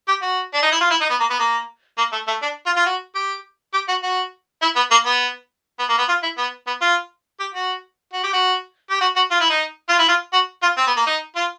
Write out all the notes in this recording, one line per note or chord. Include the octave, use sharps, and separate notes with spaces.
G4
F#4
D4
D#4
E4
F4
E4
D#4
B3
A#3
B3
A#3
A#3
A3
A3
D4
F4
F4
F#4
G4
G4
F#4
F#4
E4
B3
A#3
B3
B3
A#3
B3
F4
E4
B3
B3
F4
G4
F#4
F#4
G4
F#4
G4
F#4
F#4
F4
E4
D#4
F4
E4
F4
F#4
F4
C4
B3
A#3
D#4
F4